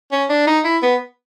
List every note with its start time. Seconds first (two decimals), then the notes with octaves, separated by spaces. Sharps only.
0.12 C#4
0.30 D4
0.47 D#4
0.65 E4
0.83 B3